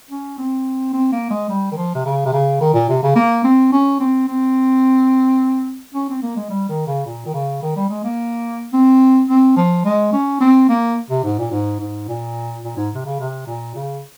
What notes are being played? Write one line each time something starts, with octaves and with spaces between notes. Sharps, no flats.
C#4
C4
C4
A#3
G#3
G3
D#3
F3
C3
C#3
C3
C#3
D#3
A#2
C3
C#3
A#3
C4
C#4
C4
C4
C#4
C4
A#3
G#3
G3
D#3
C#3
A#2
D#3
C#3
D#3
G3
G#3
A#3
C4
C4
F3
G#3
C#4
C4
A#3
C3
G#2
A#2
G#2
G#2
A#2
A#2
G#2
C3
C#3
C3
A#2
C#3